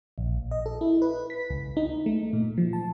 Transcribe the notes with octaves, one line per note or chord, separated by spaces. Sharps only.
A#1
D#5
A4
E4
B4
B6
C#2
D#4
A3
A#2
F3
A5